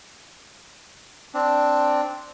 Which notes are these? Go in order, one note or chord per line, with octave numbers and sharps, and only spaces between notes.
C4 D4